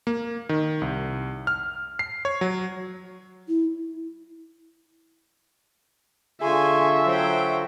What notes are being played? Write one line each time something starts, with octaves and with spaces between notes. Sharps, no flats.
A#3
D#3
C2
F6
C7
C#5
F#3
E4
D3 F4 G#4 E5 G#5 C6 C#6
F#3 C5 G5